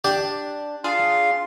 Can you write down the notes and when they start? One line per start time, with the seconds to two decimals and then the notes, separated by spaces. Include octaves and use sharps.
0.04 D4 G4
0.84 D4 F4 G#4 F5 C6